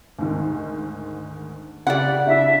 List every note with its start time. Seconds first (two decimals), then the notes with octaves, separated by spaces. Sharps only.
0.19 D2 G#2 D#3
1.87 C#3 G4 D5 F#5
2.26 C#3 D4 E4 E5